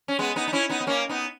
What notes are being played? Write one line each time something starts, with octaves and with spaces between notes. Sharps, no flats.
C#4
G#3 B3
B3 D#4
D#4
C#4 E4
B3 D#4
B3
A#3 C#4
B3 D#4